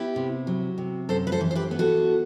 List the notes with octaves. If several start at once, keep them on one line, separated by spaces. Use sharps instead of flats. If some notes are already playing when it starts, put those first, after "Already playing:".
Already playing: B3 E4 G4
C3
F#3
C3
F#2 A4 C5
B4
A4 C5
E3
C5
G4 B4
B3
F#4 A4